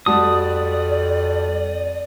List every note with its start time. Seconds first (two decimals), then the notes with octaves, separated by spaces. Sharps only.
0.06 F2 G3 F#4 D5 A5 D#6